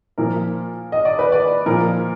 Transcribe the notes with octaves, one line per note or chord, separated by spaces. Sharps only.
A#2 F3 A#4
D#5
D5
B4
D5
A#2 F3 A#4